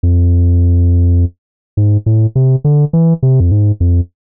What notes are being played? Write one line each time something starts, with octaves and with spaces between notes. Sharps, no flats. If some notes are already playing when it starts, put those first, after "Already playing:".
F2
G#2
A2
C3
D3
E3
C3
F2
G#2
F2